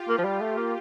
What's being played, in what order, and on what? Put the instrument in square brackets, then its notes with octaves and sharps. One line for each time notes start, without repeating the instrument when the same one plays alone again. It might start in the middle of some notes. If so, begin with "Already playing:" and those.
Already playing: [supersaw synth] F4 G4
[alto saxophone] A#3
F3
G3
A3
A#3